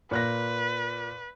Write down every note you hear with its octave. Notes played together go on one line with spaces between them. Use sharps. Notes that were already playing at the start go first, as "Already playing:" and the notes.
A#2 B4 F#6 A#6